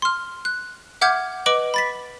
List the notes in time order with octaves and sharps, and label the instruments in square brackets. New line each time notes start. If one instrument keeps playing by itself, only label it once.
[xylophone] C6 F6
F#6
E5 F#5 D6 F6 G6 G#6
B4 D#5 D6 D7 F#7
B5 A6 B6